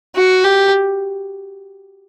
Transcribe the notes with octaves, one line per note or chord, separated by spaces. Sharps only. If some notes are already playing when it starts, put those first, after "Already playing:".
F#4
G4